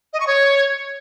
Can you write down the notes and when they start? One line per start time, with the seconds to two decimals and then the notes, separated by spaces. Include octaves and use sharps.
0.13 D#5
0.20 C#6
0.27 C#5